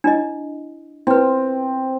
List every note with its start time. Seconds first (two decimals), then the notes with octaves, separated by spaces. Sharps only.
0.04 D4 E4 D#5
1.07 C4 E4 B4